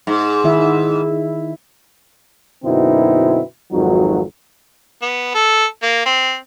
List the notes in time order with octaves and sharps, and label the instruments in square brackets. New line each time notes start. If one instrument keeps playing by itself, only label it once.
[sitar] G#2
[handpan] D#3 E4 E5
[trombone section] F#2 B2 D3 C4 D#4 E4
G#1 F2 F3 F#3 D#4 F#4
[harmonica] B3
A4
A#3
C4